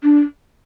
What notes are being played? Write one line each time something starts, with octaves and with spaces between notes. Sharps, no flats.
D4